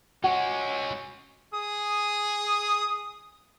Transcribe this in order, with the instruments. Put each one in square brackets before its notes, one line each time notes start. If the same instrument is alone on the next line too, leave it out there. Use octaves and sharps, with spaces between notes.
[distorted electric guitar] G#3 C#4 [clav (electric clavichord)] F#4
[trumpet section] G#4 D#6